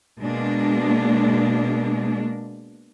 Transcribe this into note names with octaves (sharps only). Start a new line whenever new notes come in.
B2 G#3 A#3 D4